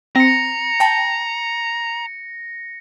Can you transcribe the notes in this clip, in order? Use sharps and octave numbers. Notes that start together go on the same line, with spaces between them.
C4 A#5 A#6 C#7
G5 A5